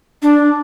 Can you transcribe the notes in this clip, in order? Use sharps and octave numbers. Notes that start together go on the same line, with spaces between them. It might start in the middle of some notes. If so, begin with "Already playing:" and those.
D4